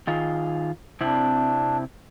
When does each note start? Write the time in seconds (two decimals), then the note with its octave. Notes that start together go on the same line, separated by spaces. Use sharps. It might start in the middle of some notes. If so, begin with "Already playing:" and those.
0.07 D#3 F4 G#4
1.01 C3 C4 D4 E4